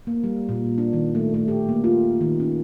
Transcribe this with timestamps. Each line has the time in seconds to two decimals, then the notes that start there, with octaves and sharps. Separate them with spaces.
0.07 A#3
0.24 G3
0.49 A#2
0.78 D4
0.93 D#3
1.15 A3
1.34 A3
1.48 G4
1.69 A#3
1.84 F4
2.21 D#3
2.40 C#4